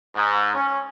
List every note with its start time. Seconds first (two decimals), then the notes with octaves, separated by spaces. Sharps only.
0.15 G#2
0.55 C#4